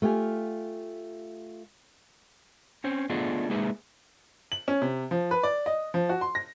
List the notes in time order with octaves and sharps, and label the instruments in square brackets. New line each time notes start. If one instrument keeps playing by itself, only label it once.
[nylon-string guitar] A3 F4 G4 F5 G#5
[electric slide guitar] C4 C#4 C5
A3 B3 D4 F4 G#4 D#5
G#3 A#3 D#4 G#4 B4 E5
[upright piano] F#7
C#4
C3
F3
B4
D5
D#5
F3
F#4
C6
A#6